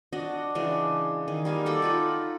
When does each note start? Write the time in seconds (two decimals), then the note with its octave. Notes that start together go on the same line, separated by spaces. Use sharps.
0.13 D4 F#4 D#5
0.55 C#3 E3 G#3 D4
1.28 D#3 G#4
1.45 G3 A#3 F5 G#5
1.66 F#4 A4 D5 G5
1.82 D#4 F4 B5